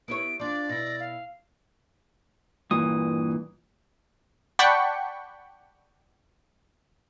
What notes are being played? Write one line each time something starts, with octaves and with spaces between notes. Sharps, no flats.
B3 E4 C#5 D7
F3 D4 D5 D6
B2 E4 A#6
F5
G2 A#2 E3 D#6
D5 F#5 G5 A5 B5 C#6